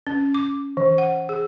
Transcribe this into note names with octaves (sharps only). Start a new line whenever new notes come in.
C#4
D6
E3
F#5
G#4